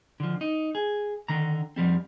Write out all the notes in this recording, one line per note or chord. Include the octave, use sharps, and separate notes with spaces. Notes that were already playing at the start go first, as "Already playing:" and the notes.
D3 F3
D#4
G#4
D3 D#3 A#5
F2 F3 G3 C4